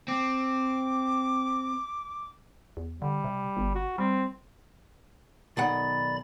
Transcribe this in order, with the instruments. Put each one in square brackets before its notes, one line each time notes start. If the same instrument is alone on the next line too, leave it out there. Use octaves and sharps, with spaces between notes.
[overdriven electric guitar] C4 [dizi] D6
[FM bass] E2
[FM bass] D3 [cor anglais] G3
[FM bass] C3
G1
[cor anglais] F#4
[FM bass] G3 [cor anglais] C4
[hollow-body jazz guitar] B1 D#3 F#5 [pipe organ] D5 B5 A6